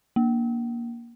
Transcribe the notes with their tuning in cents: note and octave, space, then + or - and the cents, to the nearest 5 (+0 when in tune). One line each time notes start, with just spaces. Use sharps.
A#3 +15